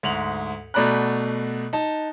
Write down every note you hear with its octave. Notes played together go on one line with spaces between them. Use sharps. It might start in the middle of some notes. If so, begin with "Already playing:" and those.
D2 G#2 F7 F#7
B2 A3 D5 A#5 B5 F#6
D#4 A5